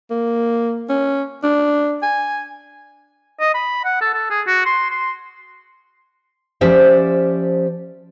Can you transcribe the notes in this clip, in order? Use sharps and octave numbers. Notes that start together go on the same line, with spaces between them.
A#3
C#4
D4
G#5
D#5
B5
F#5
A4
A4
G#4
F#4
C6
C6
F3 C#4 G4 C5 D5 E5